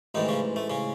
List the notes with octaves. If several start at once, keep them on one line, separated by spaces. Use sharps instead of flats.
A1 G#2 D#3 E3 D#4
C#3 C#4
A3
C#3 C#4